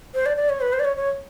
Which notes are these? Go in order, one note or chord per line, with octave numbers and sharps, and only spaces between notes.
C5
D5
D5
C#5
B4
C5
D5
C#5
C#5